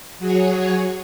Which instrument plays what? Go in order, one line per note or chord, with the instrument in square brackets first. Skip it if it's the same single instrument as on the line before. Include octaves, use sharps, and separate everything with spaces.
[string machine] F#3 F#4 G#4 C#5